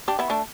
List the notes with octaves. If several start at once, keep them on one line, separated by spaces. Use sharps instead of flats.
D4 G4
B3 E4
A3 D4